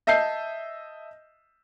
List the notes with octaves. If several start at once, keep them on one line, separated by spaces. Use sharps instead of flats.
D#5 E5 A5 G6 C7